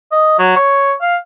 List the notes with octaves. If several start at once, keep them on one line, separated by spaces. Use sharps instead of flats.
D#5
F#3
C#5
F5